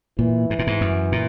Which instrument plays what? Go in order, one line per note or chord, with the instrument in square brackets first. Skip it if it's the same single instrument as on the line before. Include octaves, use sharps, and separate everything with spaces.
[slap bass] A#2 [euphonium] E3
[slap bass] G#2
A#2
G#2
F#2
A#2